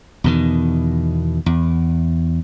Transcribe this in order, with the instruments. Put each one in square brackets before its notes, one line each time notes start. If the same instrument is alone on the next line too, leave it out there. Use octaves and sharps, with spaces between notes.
[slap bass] E2 B2 D#3
E2